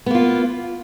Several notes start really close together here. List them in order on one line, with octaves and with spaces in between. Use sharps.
B3 A#3 F4